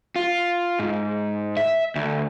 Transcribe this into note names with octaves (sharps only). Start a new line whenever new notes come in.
F4
G#2
E5
D2